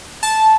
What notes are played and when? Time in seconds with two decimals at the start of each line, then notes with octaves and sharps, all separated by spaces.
0.23 A5